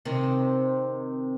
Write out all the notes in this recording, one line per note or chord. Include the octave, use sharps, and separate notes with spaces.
C3 D#3